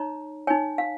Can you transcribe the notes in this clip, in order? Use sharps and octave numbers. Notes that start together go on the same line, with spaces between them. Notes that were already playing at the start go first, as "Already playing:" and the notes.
Already playing: D#4 C#5 A#5
D#4 C#5 G#5
F5